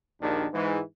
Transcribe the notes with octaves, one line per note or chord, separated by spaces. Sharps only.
A#1 D#2 D#3 D4
G#2 E3